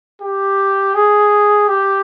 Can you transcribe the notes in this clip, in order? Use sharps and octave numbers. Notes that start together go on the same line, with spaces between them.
G4
G#4
G4